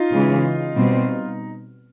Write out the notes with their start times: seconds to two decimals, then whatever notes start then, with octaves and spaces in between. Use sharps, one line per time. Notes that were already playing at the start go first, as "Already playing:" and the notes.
Already playing: D#4 F4
0.12 C#3 E3 G#3
0.75 B2 G3 C4